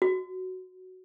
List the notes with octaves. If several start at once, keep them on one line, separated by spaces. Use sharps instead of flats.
F#4